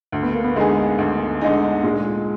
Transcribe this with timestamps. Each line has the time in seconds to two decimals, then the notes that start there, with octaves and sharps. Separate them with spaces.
0.12 D2
0.23 B3
0.34 A#3
0.45 B3
0.56 D3 G#3 D#4 G#4
0.98 D2
1.41 D3 G#3 D#4 G#4
1.83 A#2 G#3